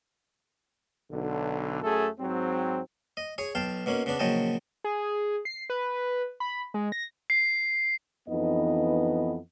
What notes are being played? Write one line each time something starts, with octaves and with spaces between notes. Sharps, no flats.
B1 D3
F#2 A3 G#4 A4
G#2 F#3 C4
D#5
G#4 C#5
B1 F5 G5 A5
B2 A#3 C#4
C#3 B3 D4
A#1 C#3 F#3 D#5 G5 A5
G#4
C7
B4
B5
G#3
A#6
C7
F2 E3 B3 D#4 D#5